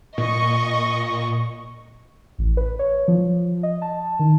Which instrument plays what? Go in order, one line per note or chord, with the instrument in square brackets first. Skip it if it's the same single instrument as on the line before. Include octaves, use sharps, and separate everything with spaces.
[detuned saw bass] A#2 [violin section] D#5 C#6
[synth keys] A1
B4
C#5
F3
D#5
A5
D#3